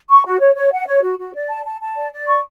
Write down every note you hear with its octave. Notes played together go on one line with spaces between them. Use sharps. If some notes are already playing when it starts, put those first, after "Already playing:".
C#6
F#4
C#5
C#5
F#5
C#5
F#4
F#4
D5
A5
A5
A5
D5
D5
C#6